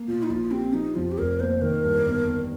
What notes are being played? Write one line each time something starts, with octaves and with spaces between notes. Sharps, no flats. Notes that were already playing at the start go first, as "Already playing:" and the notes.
Already playing: A#3
A#2 F4
D#4
A#1 F4
C4 G4
F3 D#4
F2 F4
G4
F1 A#4
A#3 C5
D#3 A#4
G2
G1
G1